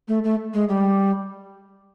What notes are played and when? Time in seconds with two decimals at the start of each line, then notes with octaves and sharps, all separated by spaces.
0.08 A3
0.24 A3
0.54 G#3
0.69 G3